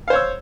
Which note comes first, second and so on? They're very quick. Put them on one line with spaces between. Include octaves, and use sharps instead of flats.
F5 C5 C#5 E6